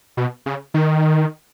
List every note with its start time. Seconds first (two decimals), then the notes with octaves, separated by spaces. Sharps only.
0.17 B2
0.46 C#3
0.74 D#3